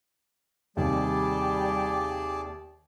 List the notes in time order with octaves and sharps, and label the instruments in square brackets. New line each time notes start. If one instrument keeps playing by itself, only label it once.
[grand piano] D#2 C3 D#3 [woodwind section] G3 [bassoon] G4 [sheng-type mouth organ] G#4 D5 A5